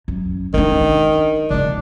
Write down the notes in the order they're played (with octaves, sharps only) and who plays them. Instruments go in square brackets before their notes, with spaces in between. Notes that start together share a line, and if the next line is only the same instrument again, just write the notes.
[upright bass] F#2
[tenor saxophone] D#3 [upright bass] D4 D#4
[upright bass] C#3 A#3 [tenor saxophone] D4